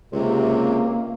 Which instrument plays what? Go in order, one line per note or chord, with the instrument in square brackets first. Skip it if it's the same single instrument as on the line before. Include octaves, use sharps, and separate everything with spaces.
[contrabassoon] C#2 [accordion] C3 [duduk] A#3